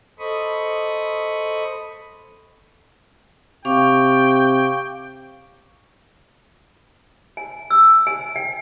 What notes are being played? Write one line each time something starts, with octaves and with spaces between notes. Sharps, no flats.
A4 C5 D#5 B5 C#6 D#6
C3 F5 G5 C#6 D6
G#5
E6
G#5
G5